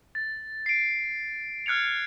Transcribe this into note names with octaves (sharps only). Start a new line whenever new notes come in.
A6
C7 D7
F6 F#6 G#6 C#7 F7